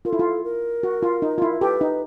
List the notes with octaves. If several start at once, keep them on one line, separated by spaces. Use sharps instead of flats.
F4 A#4
E4 A4
F4
A#4
F#4
F4
D#4
F4
E4
G4 A4 B4
D#4